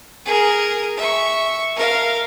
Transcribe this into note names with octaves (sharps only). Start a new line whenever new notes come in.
G#4 A#4
E5 C#6
A#4 F5